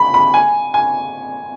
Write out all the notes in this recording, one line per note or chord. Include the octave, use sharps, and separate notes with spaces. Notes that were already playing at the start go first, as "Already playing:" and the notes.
Already playing: B5
B5
G#5
G#5